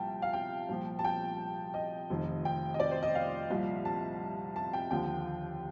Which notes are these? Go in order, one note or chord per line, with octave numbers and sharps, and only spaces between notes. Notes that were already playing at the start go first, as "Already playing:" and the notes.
Already playing: C2 A#2 F3 G5 A5
F5
G5
C2 A#2 F3
A5
G5
D#5
F1 F2 D#3
G5
D#5
D5
C5
D#5
F5
C2 A#2 F3
A5
A5
G5
D#2 D3 F3 G5